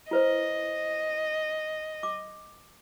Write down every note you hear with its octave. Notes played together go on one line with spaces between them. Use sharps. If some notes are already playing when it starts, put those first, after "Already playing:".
E4 B4 C5 D#5
D6